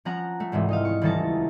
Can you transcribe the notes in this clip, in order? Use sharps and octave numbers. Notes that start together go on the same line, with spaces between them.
F3 C#4 F#5 A#5 F#6
A3
C2 G#2 C3 E3
D#4 D#5 F5
C#6
D#1 C#2 E3 A4 A5 A#5